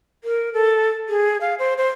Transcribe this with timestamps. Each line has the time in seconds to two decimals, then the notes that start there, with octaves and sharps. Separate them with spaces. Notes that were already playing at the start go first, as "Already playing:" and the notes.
0.24 A#4
0.53 A4
1.09 G#4
1.41 F5
1.59 C5
1.77 C5